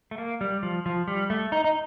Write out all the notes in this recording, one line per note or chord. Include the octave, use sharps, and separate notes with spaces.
A3
A#3
G3
F3
F3
G3
A3
D#4
D#4